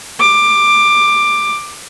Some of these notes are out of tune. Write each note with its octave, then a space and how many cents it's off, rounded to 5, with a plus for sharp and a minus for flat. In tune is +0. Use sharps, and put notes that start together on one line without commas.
D6 +15